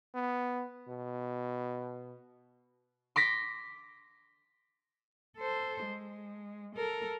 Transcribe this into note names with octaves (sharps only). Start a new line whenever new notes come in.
B3
B2
C6 D6 A#6 B6
A4 C5
G#3
A4 A#4